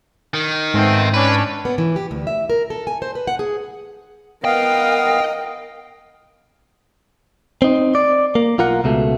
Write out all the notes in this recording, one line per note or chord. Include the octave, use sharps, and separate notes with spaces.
D#3
G#2 A3 B3 C4
C#4 D4 B4
B3
E3
G4
D2
E5
A#4
A4
G#5
C5
B4
F#5
G#4
B3 A#4 D#5 F5 G5
C4 D#4
D5
A#3
B1 F4 A#4 F#5
C#2 B2 A3